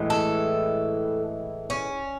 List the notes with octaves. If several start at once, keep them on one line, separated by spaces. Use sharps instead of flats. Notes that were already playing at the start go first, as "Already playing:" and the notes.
Already playing: A2 E3 G#3
A4
C#4